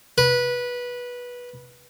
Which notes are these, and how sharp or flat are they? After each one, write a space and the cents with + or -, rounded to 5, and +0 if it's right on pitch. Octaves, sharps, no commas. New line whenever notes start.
B4 -15